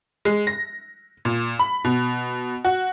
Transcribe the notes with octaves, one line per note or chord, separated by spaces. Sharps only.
G#3
A#6
A#2
B5
B2
F#4